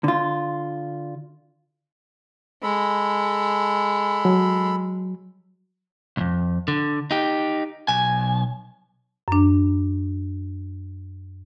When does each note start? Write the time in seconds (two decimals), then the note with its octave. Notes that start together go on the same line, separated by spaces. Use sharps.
0.04 D3 F4
2.63 G#3 A4 B5
4.25 F#3
6.17 C2 F2
6.68 D3
7.11 D#4 G4
7.88 B1 G#5
9.28 F#2 D4